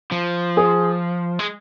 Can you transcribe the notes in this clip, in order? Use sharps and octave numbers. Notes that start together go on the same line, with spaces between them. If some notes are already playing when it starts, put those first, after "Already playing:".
F3
G#4
G#3